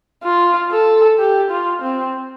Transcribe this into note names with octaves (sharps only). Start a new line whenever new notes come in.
F4
A4
G4
F4
C4